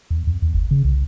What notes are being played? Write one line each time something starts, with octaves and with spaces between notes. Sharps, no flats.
E2
F2
E2
F#1
C#3
C2